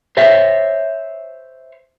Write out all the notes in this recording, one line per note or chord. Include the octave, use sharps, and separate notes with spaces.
C5 C#5 E5